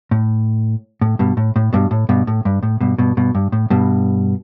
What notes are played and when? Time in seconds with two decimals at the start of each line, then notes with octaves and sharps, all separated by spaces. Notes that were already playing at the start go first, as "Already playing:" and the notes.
0.11 A2
1.01 A2
1.19 G2 B2
1.37 A2
1.56 A2
1.73 G2 B2
1.91 A2
2.09 G2 B2
2.27 A2
2.45 G2
2.63 A2
2.81 G2 B2
2.98 G2 B2
3.17 G2 B2
3.35 G2
3.52 A2
3.70 G2 B2